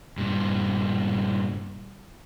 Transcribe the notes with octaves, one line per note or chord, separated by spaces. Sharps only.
G2 A#2